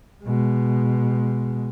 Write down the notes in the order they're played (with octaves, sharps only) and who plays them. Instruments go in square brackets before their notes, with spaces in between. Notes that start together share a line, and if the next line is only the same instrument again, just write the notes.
[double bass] B2 G#3